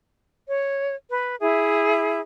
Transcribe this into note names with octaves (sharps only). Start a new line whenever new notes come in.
C#5
B4
E4 G#4 E5